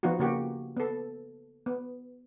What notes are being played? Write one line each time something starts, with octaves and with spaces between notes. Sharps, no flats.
F3 B3 D#4 F4 F#4
C#3 A#3 F#4 G4
B3 A4
B3